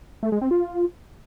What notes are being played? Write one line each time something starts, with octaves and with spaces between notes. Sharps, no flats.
A3
G#3
C4
F4